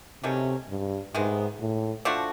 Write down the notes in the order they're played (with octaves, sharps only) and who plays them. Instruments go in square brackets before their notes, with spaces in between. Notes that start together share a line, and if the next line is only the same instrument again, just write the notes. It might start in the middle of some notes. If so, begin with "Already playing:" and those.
[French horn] C3 [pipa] D#3 F#3 A3 C#4
[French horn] G2
[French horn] G#2 [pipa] C3 D#3 G#3 B3
[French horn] A2
[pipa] F3 A3 D4 F#4